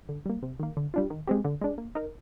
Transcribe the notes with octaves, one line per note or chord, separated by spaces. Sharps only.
D3
G3 A#3
C3
D#3 A#3
D3
G3 D4 F4
D#3
G#3 C4 G4
D3
G#3 D4
A#3
D#4 A#4